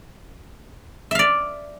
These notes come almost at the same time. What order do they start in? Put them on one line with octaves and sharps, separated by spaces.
E5 F5 D5